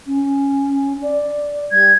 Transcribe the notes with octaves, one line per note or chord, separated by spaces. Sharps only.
C#4
D5
G3 G#6